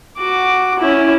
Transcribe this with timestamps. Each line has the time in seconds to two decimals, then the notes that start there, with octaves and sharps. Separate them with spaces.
0.18 F#4 D6
0.79 C#4 E4